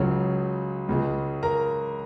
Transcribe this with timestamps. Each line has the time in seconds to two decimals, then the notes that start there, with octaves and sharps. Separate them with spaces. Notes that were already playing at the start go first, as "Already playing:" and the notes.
Already playing: C#2 C#3 F#3 C#5
0.89 C#2 C#3 G#3
1.43 A#4 A#5